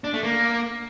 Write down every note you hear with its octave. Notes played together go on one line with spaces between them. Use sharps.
D4
A3
A#3